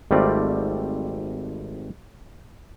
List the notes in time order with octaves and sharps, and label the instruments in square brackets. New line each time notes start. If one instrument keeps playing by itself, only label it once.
[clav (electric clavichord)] G#1 G3 A3 C4 F4 D5